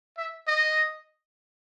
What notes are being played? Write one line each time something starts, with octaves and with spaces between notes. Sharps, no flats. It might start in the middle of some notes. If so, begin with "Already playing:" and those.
E5
D#5